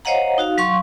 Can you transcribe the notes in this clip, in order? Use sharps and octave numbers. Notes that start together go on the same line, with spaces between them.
C5 C#5 D#5 F5 F#5 A#5
D#4 F#4 F5
F#3 F5 C6 C#6